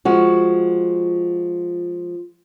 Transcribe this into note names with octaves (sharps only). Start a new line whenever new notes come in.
F3 G#3 F#4